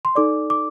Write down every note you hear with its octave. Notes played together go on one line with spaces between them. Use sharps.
C6
D#4 A4 D5 D6
D6